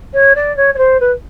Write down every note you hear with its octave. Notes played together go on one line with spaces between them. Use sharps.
C#5
D5
C#5
C#5
C5
B4